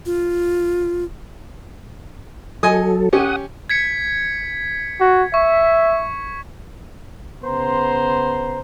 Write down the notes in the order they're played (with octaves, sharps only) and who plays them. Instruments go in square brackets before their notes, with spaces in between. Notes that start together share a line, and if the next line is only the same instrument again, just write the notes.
[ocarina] F4
[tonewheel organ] F#3 A4 [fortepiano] D#5 G#5 D#6
[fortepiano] C#4 G4 [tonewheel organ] F#5 D#6
[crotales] G#6 B6 C#7
[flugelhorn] F#4
[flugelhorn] E5 [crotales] C#6
[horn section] C#3 B3 C5 A#5 C6